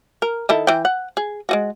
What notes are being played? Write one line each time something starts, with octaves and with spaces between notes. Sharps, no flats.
A#4
D#3 E4 A4
E3 G5
F#5
G#4
G#3 F4 F#4